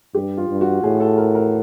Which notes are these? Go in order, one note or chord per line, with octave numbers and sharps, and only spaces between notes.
G2 G4
F4
G2
F#4
A2 G#4
A4
A#4
A#4